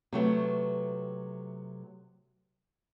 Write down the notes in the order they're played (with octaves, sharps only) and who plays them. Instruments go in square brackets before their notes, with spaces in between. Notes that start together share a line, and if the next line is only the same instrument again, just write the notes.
[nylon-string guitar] C3 F#3 A3 B3